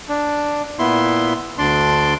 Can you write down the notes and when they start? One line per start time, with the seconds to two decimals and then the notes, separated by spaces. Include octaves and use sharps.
0.09 D4
0.79 A#2 B3 E4 C6
1.58 D2 D4 D5 C6